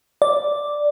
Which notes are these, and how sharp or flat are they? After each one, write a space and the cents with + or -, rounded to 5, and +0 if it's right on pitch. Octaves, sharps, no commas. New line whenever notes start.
D5 +0